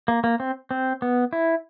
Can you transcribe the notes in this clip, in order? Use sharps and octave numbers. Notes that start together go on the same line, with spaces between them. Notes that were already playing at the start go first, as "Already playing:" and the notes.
A#3
A#3
C4
C4
B3
E4